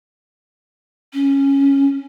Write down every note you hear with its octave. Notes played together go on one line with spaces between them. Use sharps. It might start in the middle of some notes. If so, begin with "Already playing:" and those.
C#4